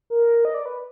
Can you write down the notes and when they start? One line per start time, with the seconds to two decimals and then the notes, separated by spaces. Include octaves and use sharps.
0.10 A#4
0.45 D#5
0.54 D5
0.66 B4